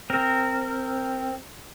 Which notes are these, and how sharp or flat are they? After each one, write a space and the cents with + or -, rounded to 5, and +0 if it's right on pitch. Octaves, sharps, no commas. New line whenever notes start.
C4 +0 A#4 -20